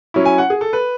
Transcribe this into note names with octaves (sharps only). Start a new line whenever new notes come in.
F#3 C#4 E4
G#5
F#5
G#4
A4
B4